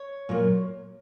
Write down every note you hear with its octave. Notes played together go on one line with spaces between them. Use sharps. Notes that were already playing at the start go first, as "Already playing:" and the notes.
Already playing: C#5
A#2 F#3 A#3